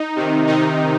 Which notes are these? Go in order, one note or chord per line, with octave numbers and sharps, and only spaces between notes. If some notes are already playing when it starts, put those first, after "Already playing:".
Already playing: D#4
C3 D#3
C3 D#3 D#4